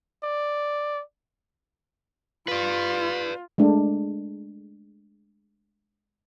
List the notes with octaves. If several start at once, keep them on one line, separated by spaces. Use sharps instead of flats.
D5
F4 B4 D5
G#3 A3 D4